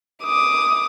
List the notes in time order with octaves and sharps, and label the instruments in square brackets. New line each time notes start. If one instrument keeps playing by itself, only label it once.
[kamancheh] D6 D#6